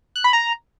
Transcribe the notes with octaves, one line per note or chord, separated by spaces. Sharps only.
F#6
B5
A#5